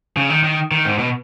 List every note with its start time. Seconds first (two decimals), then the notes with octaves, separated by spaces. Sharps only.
0.17 C#3
0.30 D#3
0.44 D#3
0.71 D#3
0.85 G#2
0.99 B2